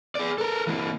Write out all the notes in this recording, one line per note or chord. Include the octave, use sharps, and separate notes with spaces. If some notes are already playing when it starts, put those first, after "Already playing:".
G#4 D5
A4 A#4
E3 A#3